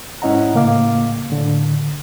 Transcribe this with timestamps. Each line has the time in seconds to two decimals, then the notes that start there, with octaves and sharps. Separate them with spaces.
0.22 G#2 C#4 E4 D#5 F#5 A#5
0.54 A2 C#3 A#3 F5 D6
1.30 A2 D3